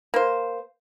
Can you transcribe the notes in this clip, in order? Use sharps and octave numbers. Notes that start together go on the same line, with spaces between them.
A#3 C5